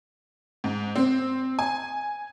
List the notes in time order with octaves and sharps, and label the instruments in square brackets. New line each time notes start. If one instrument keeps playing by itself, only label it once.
[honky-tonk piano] G#2
C4
G#5